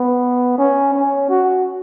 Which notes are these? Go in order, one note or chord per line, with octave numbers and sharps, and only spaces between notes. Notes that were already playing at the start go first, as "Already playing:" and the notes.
Already playing: B3
C#4
C#4
F#4